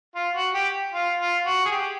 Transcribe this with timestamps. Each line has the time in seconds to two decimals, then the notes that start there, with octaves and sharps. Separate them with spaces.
0.15 F4
0.35 F#4
0.54 G4
0.93 F4
1.19 F4
1.45 F#4
1.65 G#4
1.72 G4